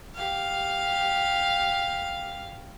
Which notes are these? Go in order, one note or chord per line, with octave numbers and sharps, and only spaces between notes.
G4 F5